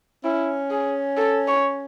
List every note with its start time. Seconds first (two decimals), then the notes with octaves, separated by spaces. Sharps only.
0.24 C#4 E4
0.71 G#4
1.17 A4
1.48 C#5